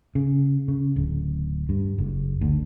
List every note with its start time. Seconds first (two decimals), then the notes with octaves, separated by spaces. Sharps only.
0.15 C#3
0.68 C#3
0.96 D1
1.69 G2
1.98 F#1
2.41 D2